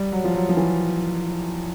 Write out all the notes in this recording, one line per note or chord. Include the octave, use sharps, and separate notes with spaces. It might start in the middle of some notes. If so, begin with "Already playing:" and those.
Already playing: G3
F#3
F3
F#3
F3
E3